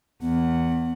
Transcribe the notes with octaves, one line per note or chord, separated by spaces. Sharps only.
E2 B3 F#5